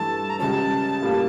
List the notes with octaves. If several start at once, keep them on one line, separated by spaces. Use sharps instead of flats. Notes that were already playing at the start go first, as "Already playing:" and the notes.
Already playing: G2 E3 A3 A5
A#5
C#2 C#3 G3 C#4 A5
A2 G3 A#3